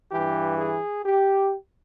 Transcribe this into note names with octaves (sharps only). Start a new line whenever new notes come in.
G2 E3 G4
G#4
G4